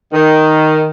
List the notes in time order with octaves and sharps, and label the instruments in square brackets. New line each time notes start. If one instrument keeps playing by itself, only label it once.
[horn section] D#3